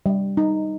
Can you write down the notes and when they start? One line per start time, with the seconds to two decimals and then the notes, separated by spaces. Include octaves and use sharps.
0.06 G3
0.37 D#4